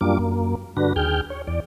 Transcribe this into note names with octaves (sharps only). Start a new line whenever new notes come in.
F#2 G3 A#3 D4 F4 D6
F#2 A#3
G2 D3 D4 F#4 B4 A#6
D#2 G#4 G5 F6 G6
C#5
E2 D5